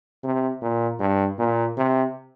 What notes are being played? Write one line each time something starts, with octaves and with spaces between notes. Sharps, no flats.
C3
A#2
G2
A#2
C3